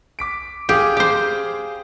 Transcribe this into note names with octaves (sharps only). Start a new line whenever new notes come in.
D6 B6 D7
G4 G#4 F5 G5
G4 C5